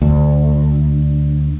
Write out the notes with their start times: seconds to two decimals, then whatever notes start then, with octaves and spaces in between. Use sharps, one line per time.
0.02 D2